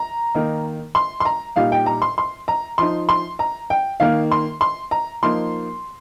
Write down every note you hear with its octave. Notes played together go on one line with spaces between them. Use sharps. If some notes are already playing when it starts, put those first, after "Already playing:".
Already playing: A#5
D#3 A#3 D#4
C6
C6
A#5
A#2 G3 D#4 F5
G5
A#5
C6
C6
A#5
F3 D#4 C6
C6
A#5
G5
D#3 A#3 D#4 F5
C6
C6
A#5
F3 A#3 D#4 C6